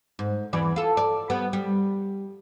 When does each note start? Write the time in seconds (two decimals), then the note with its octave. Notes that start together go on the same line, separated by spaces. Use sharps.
0.19 G#2
0.53 E2 E3 D5
0.76 F4 A4
0.97 D5
1.30 G3 B3
1.53 G3